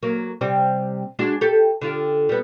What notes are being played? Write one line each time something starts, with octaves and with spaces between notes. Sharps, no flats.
F#3 A#3
C3 G3 C4
G#3 D4 F#4
G4 A4
D3 F4 G4
G3 B3